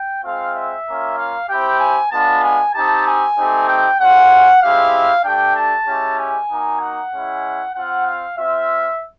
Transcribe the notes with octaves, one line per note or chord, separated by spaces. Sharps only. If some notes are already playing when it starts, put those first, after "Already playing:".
Already playing: G5
G#3 C4 F4 F5
E5
A#3 C#4 F4
F5
C4 E4 G4 G5
G#5
G#3 B3 D4 F4 A5
G#5
C4 D#4 G4 A5
G#5
A3 C4 D#4 G4
G5
G#3 C#4 F4 F#5
G#3 C4 E4 G4 F5
A3 D4 G4 G5
A5
G#3 C#4 E4 G4
G#5
A#3 D#4 F#4
F#5
G#3 C#4 E4
C4 F4 F#5
F5
C4 F4 E5